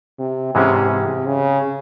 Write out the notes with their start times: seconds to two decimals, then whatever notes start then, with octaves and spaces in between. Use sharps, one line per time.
0.18 C3
0.55 G#2 C3 E3 G#3 C#4
0.91 C3
1.26 C#3